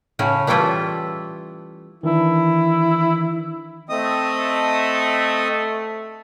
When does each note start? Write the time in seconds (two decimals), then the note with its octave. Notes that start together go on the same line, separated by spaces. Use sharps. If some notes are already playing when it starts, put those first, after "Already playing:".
0.19 A2 C#3 C#4
0.47 E3 G3 A3 E4 F4
2.03 D#3 E3 D4 E4
3.89 A3 C4 D#5 D#6